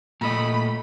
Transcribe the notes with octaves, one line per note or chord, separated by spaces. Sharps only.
A#2 A3 D#5 B5